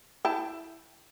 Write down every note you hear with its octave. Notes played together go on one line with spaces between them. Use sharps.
E4 G5 A5